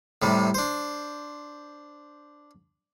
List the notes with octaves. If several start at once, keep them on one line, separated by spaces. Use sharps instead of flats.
A2 C3 G3
D4 C5